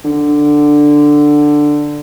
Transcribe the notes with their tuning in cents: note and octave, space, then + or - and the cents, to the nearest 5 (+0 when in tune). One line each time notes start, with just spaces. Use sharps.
D3 +5